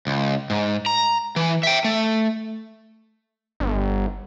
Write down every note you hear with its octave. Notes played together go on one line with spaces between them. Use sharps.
C#2
G#2
A#5
E3
E5 G5
A3
G1